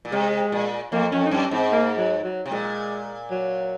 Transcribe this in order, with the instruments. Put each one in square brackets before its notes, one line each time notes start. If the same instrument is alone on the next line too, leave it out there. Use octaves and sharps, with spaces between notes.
[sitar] A#2
[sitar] C3 [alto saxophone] G#3
[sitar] A#2
[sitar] F2 [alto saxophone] A#3
[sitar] F2 [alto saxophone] C#4
[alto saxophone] D#4
[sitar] F#2 [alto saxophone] C#4
[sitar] G#2 [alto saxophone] C4
[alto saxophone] A#3
F#3
F#3
[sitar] C3
[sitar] A#2 [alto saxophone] G#3
[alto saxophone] F#3